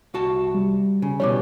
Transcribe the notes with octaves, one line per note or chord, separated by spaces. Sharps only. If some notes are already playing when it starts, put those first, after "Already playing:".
C2 F#4 A5
G3
C#3
B2 E3 G3 C#5 D6